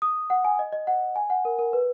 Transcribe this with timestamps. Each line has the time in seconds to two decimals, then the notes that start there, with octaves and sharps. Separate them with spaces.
0.02 D#6
0.30 F#5
0.45 G#5
0.59 D#5
0.73 D#5
0.87 F#5
1.16 G#5
1.30 F#5
1.45 A#4
1.59 A#4
1.73 B4